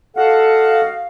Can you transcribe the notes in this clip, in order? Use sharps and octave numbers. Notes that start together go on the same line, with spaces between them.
F#4 A4 D#5 F5 F#5